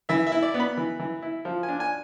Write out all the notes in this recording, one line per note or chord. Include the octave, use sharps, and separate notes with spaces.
E3 E5
E5
E4
D5
B3
B5
E3
E3
E4
F3
G#5
D4
G#5